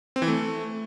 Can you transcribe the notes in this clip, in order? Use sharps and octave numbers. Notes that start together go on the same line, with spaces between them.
C4
E3
A3